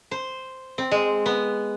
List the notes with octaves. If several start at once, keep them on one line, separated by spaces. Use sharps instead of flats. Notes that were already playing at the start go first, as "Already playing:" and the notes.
C5
C4
G#3
B3